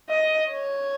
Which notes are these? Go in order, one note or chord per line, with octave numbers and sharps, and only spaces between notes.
D#5
C#5